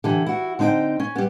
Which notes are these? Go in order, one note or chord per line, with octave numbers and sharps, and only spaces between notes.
D3 E3 G4
E4 F#4
D3 C4 D#4 D#5 G5
C#4
G3 B3